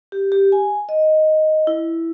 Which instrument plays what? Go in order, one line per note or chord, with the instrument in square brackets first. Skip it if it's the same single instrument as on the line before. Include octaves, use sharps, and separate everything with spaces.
[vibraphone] G4
G4
G#5
D#5
E4